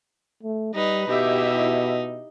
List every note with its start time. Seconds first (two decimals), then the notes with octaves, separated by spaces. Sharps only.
0.43 A3
0.74 G3 D#4 B4
1.08 B2 D#4 E4 G4 E5